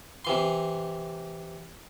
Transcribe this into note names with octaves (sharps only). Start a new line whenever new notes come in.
C3 E3 C6